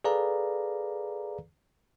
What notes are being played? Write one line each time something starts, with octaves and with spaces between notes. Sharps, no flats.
G#4 A4 B4 D5 F5 A#5